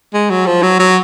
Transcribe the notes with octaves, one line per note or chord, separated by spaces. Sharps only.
G#3
F#3
F3
F#3
F#3